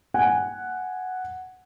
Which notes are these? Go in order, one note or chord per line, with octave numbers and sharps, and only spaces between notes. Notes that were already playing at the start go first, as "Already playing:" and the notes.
F#5 G#5